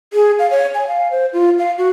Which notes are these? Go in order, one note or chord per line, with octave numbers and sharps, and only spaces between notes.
G#4
F5
C#5
G#5
F5
C5
F4
F5
F#4